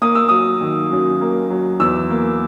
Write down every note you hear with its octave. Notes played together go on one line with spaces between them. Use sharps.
A#3 D#6
E6
F#3 D#6
D#3
F#2
A#3
F#3
E2 E6
A#3